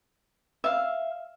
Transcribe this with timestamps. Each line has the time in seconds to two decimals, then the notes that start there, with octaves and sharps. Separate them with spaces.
0.64 E5 F5